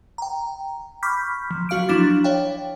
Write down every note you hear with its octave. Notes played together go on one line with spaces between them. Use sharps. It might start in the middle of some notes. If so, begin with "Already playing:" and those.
G5 A#5
B5 C#6 D6 F6 G6 B6
F3
F#3 F#4 F5 F6 D7
F3 F#3 D4 E4 D6 A6
C#5 F5 G5